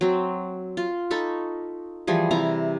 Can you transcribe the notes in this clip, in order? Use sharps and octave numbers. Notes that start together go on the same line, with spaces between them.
F#3 C4
F4
D#4 A4 B5 C#6
E3 F3 G3 G#4
C3 E4 A#5